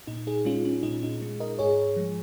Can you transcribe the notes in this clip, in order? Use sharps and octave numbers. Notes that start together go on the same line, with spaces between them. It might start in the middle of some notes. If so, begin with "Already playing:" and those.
A#2 D#4
D#4 G#4
G#3 C#4 F4
C#4
A#2 D#4
D#4
G#3
A#4 D#5
G#2 G#4 C#5
F3 G#3